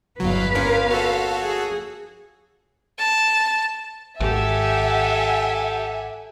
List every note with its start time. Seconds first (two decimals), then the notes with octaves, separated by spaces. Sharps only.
0.20 G1 E2 F#3 B3 B4 F5
0.55 A#3 C#4 F4 A#4 F5
0.91 F#4 A4
1.42 G#4
2.99 A5
4.20 G#1 G4 A4 E5 F#5 G#5